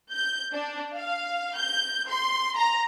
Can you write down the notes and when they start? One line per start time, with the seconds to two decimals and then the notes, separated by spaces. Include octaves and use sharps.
0.12 G6
0.52 D4
0.95 F5
1.56 G6
2.08 C6
2.56 A#5